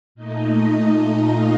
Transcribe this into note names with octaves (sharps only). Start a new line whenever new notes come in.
A#2 A3 D#4 D#5
F4 F5